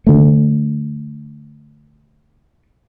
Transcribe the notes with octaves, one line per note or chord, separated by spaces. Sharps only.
D3 A3